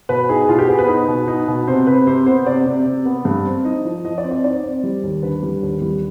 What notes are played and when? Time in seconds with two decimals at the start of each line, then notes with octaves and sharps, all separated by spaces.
0.09 B2 B4
0.29 D#4 G#4
0.49 B2 F4
0.59 G4
0.69 B3 G#4
0.79 B4
0.88 D#4
1.08 B2
1.28 D#4
1.48 B2
1.67 C3 C5
1.87 C3 B4
2.07 C3 C5
2.26 B3 C5
2.46 C3 D5
2.66 C3
2.86 C3
3.06 B3
3.25 G2
3.45 C4
3.65 D#4 D#5
3.85 F3
4.05 F3 D#5
4.18 D5
4.24 C4
4.31 D5
4.44 D#4 D5
4.63 C4
4.84 G3
5.03 D#2
5.23 D3 B4
5.43 G3
5.62 D#2
5.82 G3